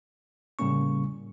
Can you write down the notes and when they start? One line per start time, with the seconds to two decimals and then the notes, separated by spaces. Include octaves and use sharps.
0.59 A2 C#3 G3 A#3 C#4 C#6